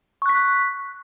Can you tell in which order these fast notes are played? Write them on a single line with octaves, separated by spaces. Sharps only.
C#6 F#6 B6